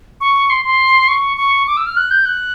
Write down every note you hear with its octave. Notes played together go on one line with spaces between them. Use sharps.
C#6
C6
C6
C#6
C#6
D6
E6
F6
F#6
G6
F#6